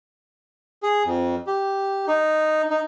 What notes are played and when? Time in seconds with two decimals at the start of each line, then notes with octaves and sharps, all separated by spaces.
0.83 G#4
1.05 F2
1.47 G4
2.08 D#4
2.70 D#4